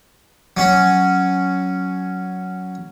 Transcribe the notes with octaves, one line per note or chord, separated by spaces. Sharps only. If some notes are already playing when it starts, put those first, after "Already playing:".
F#3 C#4